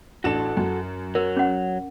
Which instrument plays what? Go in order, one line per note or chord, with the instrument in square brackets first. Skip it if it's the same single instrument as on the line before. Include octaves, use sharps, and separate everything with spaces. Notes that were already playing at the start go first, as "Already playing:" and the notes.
[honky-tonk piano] A1 D4 E7 [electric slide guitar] F#4 A4
[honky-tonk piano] F#2
[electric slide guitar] F#3 [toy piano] A#4
[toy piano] C#4 F#5